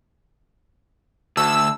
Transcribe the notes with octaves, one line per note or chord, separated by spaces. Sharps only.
D2 F#4 A4 E6